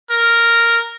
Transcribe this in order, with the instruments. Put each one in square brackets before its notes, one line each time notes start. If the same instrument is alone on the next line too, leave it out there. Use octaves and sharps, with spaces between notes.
[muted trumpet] A#4